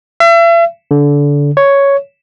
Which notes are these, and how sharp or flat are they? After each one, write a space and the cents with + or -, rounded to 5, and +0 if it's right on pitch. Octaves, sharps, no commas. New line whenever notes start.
E5 +40
D3 -25
C#5 +5